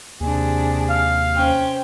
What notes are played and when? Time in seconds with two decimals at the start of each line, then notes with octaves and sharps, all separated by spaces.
0.21 D#2 C3 D4 G#4
0.90 F5
1.36 C#4 C5 G5